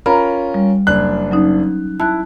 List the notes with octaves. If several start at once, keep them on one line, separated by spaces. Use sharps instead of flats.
C#4 F4 A#4 A#5 B5
G3
F#1 D4 F#6
F#3 C#4 D#4
E4 A5 F#6